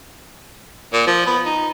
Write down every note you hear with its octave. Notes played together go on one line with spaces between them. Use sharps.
A#2
F3
B3
D#4